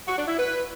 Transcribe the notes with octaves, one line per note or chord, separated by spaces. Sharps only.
F#4
D4
E4
B4